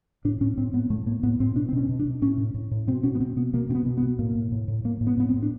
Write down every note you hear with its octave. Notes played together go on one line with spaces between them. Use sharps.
A2 D4
A2 C#4
A2 C4
A2 B3
A2 A3
A2 A#3
A2 B3
A2 C4
B2 D4
C4
B2 C#4
B2
D4
B2
A2 C#4
A2
A2
A2
B2 C4
B2 C#4
B3
B2 C4
B2 B3
B2 A#3
B2 C4
B3
B2
B3
B2
A2 A#3
A2
A2
A2
A2 A#3
A2
B3
A2 B3
C4
A2
D4